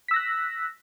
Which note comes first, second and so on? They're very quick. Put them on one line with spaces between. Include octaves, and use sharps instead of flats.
B6 E6 A#6 F#6